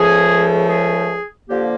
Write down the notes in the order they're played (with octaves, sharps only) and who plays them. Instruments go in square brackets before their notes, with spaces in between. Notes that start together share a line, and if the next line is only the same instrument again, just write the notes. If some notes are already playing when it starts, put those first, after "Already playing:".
Already playing: [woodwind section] C#2 C#3 F3 A3 G#4
G#4
D3 F3 A#3 G4